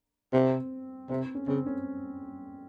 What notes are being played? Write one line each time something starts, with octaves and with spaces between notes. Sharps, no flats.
C3 C4
C3 C4
C#4
C#3 C4
C#4